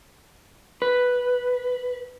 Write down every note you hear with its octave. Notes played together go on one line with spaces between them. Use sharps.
B4